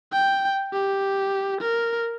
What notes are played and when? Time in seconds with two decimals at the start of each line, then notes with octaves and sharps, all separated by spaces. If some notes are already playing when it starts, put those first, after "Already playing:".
0.13 G5
0.73 G4
1.61 A#4